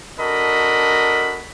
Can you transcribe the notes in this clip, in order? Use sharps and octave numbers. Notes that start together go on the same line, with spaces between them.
D4 F#4 A4 A#4 D#5 B5